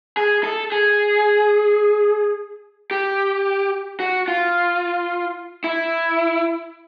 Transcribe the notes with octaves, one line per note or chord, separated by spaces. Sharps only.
G#4
A4
G#4
G4
F#4
F4
E4